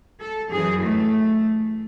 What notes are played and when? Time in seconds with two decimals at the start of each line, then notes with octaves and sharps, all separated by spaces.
0.20 A4
0.51 F#2 E3 G#4
0.81 A3